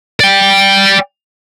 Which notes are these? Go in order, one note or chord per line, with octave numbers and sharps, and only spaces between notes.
D5 G5